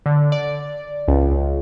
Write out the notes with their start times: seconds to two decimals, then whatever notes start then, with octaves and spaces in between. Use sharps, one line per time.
0.06 D3
0.32 D5
1.08 C#2